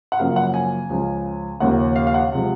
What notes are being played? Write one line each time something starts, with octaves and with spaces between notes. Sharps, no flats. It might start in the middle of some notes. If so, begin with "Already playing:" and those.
F#5
F#2 C#3 F3 A#3 F5
F#5
G#5
C#2 C#3 F3
D#2 C#3 F3 A#3 F#5
F5
F5
F#5
C3 F3 G#3